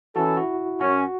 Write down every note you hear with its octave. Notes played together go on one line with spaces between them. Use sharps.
E3 C#4 F#4 A4
E4
F#4
F#2 F#3 C#4 F#4